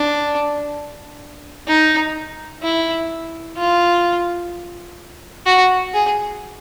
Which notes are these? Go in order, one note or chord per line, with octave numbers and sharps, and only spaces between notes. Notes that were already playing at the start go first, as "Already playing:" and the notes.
Already playing: D4
D#4
E4
F4
F#4
G#4